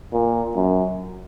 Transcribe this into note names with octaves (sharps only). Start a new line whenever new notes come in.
A#2
F#2